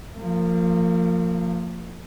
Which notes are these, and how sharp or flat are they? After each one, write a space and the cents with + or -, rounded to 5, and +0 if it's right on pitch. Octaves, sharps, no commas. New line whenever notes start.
F3 +0 A#3 -35